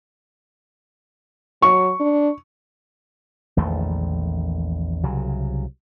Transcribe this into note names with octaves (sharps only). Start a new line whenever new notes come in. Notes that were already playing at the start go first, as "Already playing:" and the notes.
F#3 C#6
D4
A#1 E2 D#3 A3
C2 C#3 F#3